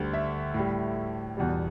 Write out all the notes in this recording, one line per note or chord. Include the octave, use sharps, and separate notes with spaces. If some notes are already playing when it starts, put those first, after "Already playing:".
Already playing: D2 D3 G3
E5
A2
G3
E2 B2 G3